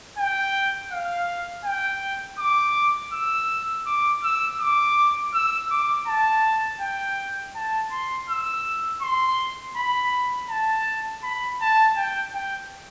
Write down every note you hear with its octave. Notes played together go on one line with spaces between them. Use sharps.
G5
F5
G5
D6
E6
D6
E6
D6
E6
D6
A5
G5
A5
C6
E6
C6
B5
A5
B5
A5
G5
G5